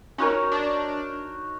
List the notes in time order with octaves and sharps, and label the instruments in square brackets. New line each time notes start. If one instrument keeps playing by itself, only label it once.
[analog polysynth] C#4 [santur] D#4 F#4 A#4 C#5
[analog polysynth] D4